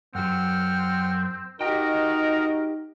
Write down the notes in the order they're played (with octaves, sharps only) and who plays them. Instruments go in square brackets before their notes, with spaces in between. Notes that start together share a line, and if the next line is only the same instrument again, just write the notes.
[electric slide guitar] F#2 F#3 [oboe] C4 [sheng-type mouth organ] F#5 G5 F6
[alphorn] D#4 [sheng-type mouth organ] F#4 D#5 [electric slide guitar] G4 G5 [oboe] A#4